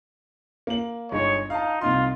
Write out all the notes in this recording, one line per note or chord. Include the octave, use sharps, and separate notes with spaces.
A#3 F#7
G1 G#3 D#4 C#5
D#4 F5 A5
C2 D#4 F4 C6